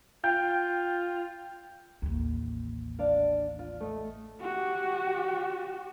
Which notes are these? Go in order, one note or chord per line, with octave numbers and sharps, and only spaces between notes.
F4 G5 G6
A1 D#2
D4 F5
F4
A3 D#5
F#4 G4